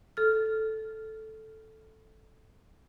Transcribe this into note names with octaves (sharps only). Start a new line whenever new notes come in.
A4 F6